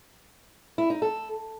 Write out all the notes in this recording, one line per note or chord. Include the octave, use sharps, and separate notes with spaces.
E4
D#4
A4